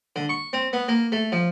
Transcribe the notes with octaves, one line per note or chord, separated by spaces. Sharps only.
D3
C#6
C4
B3
A#3
A3
F3